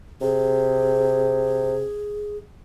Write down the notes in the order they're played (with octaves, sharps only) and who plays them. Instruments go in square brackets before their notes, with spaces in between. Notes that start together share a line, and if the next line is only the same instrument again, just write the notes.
[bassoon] C3 [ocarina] G#4